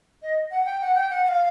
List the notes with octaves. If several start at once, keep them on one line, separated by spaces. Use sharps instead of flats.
D#5
F#5
G5
F#5
G5
F#5
F#5
F5